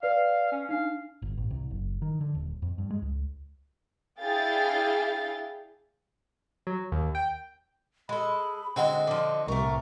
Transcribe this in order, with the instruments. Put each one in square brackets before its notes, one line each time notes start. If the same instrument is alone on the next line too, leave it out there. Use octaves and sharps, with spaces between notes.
[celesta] B4 D5 [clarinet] F5
[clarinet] C#4
[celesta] D4 D#4 [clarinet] F5
[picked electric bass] G1
A1
C2
F#1
D#3
D3
D#1
F2
G2
G#3
C#2
[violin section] D4 E4 G#4 F5 G5 A6
[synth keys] F#3
D#2
G5
[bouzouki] G#3 A4 [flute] B5
[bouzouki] D3 G#3 [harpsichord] C4 F#4 [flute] D#5
[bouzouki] D3 F3
[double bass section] C2 A2 C3 [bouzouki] A3 A#4 [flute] C#6